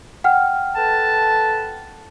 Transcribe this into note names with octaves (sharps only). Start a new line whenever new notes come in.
F#5 G5 F6
A4 B4 A5